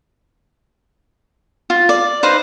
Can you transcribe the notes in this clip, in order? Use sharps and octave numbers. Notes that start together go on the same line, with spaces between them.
F4
D5
D#4 B4 C5 F5